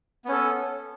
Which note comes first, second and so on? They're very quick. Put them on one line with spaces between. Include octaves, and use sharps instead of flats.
B3 C#4 A4